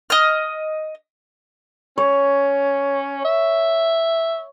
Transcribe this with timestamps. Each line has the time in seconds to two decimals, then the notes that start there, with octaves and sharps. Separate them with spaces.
0.10 D#5 F6
1.98 C#4 C#5
3.24 E5